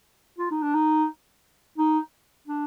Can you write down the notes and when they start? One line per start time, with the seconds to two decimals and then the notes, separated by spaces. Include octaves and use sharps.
0.38 F4
0.51 D#4
0.62 D4
0.74 D#4
1.78 D#4
2.47 D4